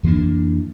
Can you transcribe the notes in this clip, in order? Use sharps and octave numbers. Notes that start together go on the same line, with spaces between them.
F2 E3 A#3 D4